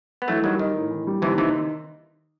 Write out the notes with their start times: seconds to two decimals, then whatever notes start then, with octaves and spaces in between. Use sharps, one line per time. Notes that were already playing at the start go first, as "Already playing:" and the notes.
0.22 B3
0.28 E3 F#3 A3
0.44 D#3 F#3 G3
0.59 D#3 D#4
0.76 A2
0.91 E3
1.07 G3
1.22 D#2 C3 E3
1.37 C3 D#3 E3